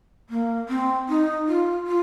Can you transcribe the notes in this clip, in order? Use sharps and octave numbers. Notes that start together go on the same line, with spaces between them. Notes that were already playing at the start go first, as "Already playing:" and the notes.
A#3
C4
D#4
F4
F4